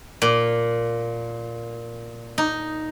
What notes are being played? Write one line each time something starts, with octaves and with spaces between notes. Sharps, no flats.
A#2
D#4